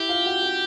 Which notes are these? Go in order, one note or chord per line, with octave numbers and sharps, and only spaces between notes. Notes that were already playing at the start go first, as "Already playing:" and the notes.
Already playing: E4 G4 E5
F4 F5
F#4 F#5
F#4 F#5